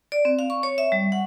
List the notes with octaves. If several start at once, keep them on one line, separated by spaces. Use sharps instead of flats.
D5
C4
F5
C#6
C#5
E5
G3
F#5